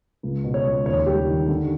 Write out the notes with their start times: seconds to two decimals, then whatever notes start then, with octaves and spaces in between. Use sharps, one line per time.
0.23 C#2
0.44 B2
0.54 C#5
0.66 C#2
0.86 D#2 C#5
1.06 G3 G4
1.29 D#3
1.48 D3